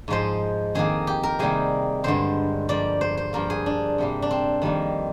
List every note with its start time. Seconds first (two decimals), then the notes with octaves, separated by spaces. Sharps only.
0.08 G#2 F3 G#3 C5
0.75 F2 D#3 A#3 G#4
1.07 G4
1.23 A#4
1.39 C3 D#3 G3 A#3 G#4
2.04 G2 D3 G#3 C5
2.69 G2 F3 A#3 D5
3.01 C5
3.17 C5
3.33 G2 F3 A#3 A#4
3.50 G#4
3.66 D4
3.98 C3 G3 A#3
4.22 D4
4.31 C4
4.62 F2 D#3 G3 A#3